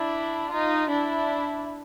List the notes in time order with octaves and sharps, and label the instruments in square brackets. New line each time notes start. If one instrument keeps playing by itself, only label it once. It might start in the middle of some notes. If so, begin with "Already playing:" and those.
Already playing: [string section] D4 E4
D#4 F4
D4 E4